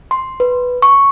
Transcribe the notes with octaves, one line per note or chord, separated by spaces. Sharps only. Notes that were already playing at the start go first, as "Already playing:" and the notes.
C6
B4
C#6